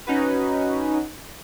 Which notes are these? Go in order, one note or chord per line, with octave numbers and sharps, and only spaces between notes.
C#4 D#4 F#4 B4